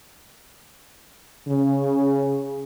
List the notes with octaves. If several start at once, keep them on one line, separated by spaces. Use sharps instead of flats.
C#3